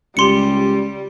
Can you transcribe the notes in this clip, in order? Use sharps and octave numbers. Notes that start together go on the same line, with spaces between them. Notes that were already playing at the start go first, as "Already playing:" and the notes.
C#2 G3 G4 C6 C#7